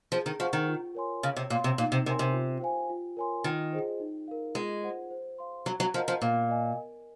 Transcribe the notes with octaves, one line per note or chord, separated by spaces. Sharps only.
F3 G#4
D#3
F3 C5 F#5 C#6
D#3
F4
A#4 C#5 G#5 C6
C#3 C#5
C3
A#2 F5 C6
C3
A#2 D#4
C3
C3 A#4 C#5 G#5 C6
C3
F4
C5 F5 G#5
F4
A#4 C#5 G#5 C6
D#3 F4
G#4 C5 D#5
D#4
A#4 F5
G#3 F4
G#4 C5 F#5
C5
F5 C6
F#3 F#4
F#3
F3 A#4 D#5 F#5 A#5
F3
A#2 A#4
D#5 G#5
A#4